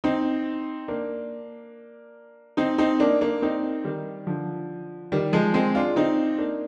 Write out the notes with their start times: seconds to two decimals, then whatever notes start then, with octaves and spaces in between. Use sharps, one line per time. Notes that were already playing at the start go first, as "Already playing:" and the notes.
0.04 C4 D#4
0.88 A#3 D4
2.57 C4 D#4
2.78 C4 D#4
3.00 A#3 D4
3.21 A#3 D4
3.42 C4 D#4
3.84 D#3 G3
4.27 D3 F3
5.12 D#3 G3
5.33 F3 G#3
5.54 G#3 C4
5.75 D4 F4
5.96 C4 D#4
6.38 A#3 D4